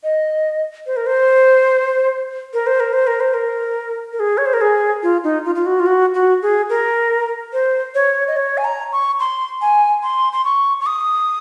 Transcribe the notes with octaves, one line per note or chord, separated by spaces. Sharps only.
D#5
C5
A#4
C5
A#4
C5
A#4
C5
A#4
C5
A#4
A#4
G#4
C#5
C5
A#4
G#4
F4
D#4
F4
F4
F#4
F4
F#4
F#4
G#4
A#4
C5
C#5
D#5
C#5
G#5
A#5
C#6
C6
G#5
C6
C6
C#6
C#6
D#6